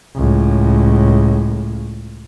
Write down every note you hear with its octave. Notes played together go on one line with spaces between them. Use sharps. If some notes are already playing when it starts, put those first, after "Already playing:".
C#2 A2